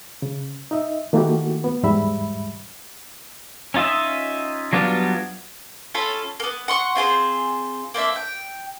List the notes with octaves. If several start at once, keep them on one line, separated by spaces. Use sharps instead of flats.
C#3
D#4 D#5 E5
D#3 A3 A#3 E4 F#4 G4
B3
E2 G#2 G3 E5 B5
C#4 D#4 F4 D#5 E5
F#3 G3 B3 D4 F4
C#4 F4 A4 B5
A#3 B3
F#5 C6 C#6
C4 F4 G#4 C5
A#3 C4 D4 E5
G5